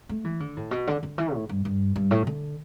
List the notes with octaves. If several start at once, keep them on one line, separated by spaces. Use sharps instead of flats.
A3
E3
D3
A2
B2
D3
D3
E3
A2
G2
G2
G2
A2
D3